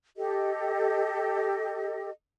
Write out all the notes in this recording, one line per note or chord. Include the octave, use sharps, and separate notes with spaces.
G4 A4 D#5